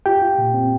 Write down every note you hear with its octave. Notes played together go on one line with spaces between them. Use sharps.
F4 G4 G5
F4
A#2
C4